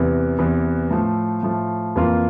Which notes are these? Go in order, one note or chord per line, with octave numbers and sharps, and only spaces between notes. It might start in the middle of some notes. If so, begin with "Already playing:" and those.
Already playing: E2 C3 E3
E2 C3 E3
A2 F3 A3
A2 F3 A3
F2 E3 A#3 F4